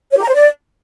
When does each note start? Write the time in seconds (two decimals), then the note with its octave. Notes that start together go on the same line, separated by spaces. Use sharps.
0.12 C#5
0.17 G4
0.23 A#5
0.28 C5
0.34 D5